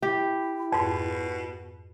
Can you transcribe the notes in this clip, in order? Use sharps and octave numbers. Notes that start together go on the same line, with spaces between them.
E4 G4
F2 G#2 B2